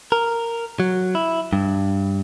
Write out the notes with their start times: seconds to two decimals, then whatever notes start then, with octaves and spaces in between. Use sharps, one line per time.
0.12 A#4
0.80 F#3
1.15 E4
1.53 G2